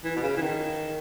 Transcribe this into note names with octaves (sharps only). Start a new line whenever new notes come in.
E3
B2
C#3
E3
D#3